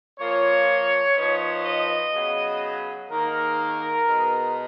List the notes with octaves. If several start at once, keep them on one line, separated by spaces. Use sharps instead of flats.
F3 A#3 F4 C#5
F3 B3 D#4
D#5
C#3 F#3 B3
G#2 D#3 A#3 D#4 A#4
B2 G#3 B3 D#4